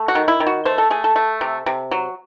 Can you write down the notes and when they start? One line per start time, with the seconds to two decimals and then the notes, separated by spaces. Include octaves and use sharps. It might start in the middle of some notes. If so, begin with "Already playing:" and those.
Already playing: A3
0.08 F#4
0.15 D#3
0.28 E4
0.40 D#3
0.47 F#4
0.65 A3 C5
0.78 A4
0.90 A3 G#4
1.04 A4
1.16 A3
1.41 C3
1.66 C3
1.91 F#3